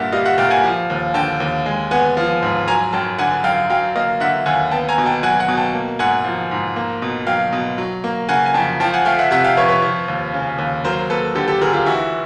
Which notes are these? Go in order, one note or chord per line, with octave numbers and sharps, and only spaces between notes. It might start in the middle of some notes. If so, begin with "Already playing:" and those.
Already playing: G2 A#2 A#3 E5 F#5
G3 D#5 F5
E5 F#5
A#2 F5 G5
F#5 G#5
F3
D#2
D3 G5 A5
D#2
G#3
B3 F#5 G#5
F3
G#2
F#3 G#5 A#5
F#2 G5 A5
D3 F#5 G#5
F#2 F5 G5
F#3 F5 G5
A#3 D#5 F5
D3 E5 F#5
D#2 F#5 G#5
B3 G5 A5
G#5 A#5
B2
G5 A5
F#3 F#5 G#5
F#5 G#5
B2
G5 A5
A#3
G#2 F#5 G#5
F3
G#2
A#3
B2
F#3 F5 G5
B2
F#3
A#3
C#3 F#5 G#5
G#5
F2 G5 A5
F3 G5 A5
F#5 G#5
A3 F5 G5
E5 F#5
C3 E5 F#5
F5 G5
F2 B4 C#5
B4 C#5
F3
D#2
C#3
D#2
F#3 A#4 C5
A#3 A4 B4
D3 G4 A4
G4 A4
D2 G#4 A#4
F4 G4
E3 E4 F#4